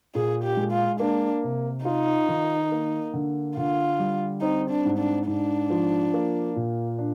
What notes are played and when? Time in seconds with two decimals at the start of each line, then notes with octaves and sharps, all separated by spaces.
0.15 A#2 G#4
0.44 G4
0.57 G#3
0.72 F4
1.00 A#3 D4
1.43 C3
1.85 D#4 F4
2.28 D#3
2.72 A#3
3.14 D3
3.57 D3 F4
3.99 G3
4.41 C4 D#4
4.70 D4
4.85 G#2
4.99 D4
5.27 G#2 D4
5.70 F3
6.14 A#3
6.56 A#2
6.99 D4